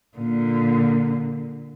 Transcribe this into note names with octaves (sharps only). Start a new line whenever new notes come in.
A#2 D3